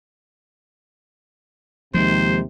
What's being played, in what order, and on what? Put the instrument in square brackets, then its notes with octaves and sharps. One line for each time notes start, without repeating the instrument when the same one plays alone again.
[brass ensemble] D#2 C3 [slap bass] F3 G#3 [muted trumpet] C5